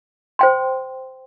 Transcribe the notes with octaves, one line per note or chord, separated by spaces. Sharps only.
C5 G5 C6